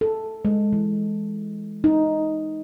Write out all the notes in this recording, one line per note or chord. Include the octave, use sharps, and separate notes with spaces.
A4
G#3
E3
D#4